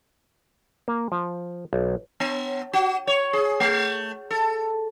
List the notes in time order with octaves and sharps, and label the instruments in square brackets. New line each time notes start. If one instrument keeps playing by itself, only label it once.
[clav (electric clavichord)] A#3
F3
B1
[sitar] B3
F#4
C#5
G#4
A3
A4